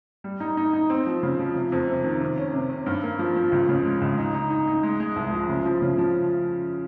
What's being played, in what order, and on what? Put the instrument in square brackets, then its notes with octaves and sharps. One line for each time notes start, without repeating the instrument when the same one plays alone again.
[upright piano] G3
D#4
D#4
D#4
C4
F3
C#3
F3
C3
F2
C3
D#3
C3
C#4
C3
C#4
G2
A#3
F3
F3
C#2
C#3
G#3
C#2
D#4
D#4
D#4
D#4
G#3
G#3
C2
F3
C#3
F3
C#3
F3